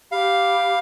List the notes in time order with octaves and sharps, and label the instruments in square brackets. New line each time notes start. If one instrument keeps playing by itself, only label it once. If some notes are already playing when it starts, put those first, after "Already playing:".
[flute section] G4 B5 [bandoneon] F5